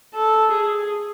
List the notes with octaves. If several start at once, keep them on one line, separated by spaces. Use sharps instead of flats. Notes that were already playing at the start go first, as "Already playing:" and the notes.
A4
G#4